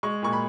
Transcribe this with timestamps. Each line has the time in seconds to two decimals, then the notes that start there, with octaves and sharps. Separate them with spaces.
0.03 G#3 C#6
0.22 A#2 C#6
0.33 B5